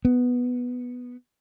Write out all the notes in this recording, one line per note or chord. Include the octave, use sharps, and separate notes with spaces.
B3